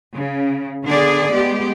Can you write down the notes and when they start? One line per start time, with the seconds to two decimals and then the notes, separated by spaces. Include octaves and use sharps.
0.17 C#3
0.86 D3 B3 G#4 D5
1.31 G#3 B3 G4